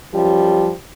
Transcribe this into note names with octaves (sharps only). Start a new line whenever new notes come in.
F#2 F3 G3 G4